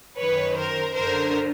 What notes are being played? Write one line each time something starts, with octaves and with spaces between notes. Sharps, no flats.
F#2 D#3 B4 C#5
A#4 C5
F#2 D3 A#4 C5